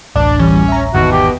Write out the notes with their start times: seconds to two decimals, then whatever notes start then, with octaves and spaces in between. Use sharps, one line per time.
0.16 D1 A1 D4
0.39 E3 G3 C#4
0.68 E5 A#5
0.94 G#1 E2 B2 D#3 F#4
1.12 G4